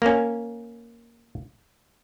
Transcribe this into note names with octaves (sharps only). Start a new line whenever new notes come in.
A#3 C#4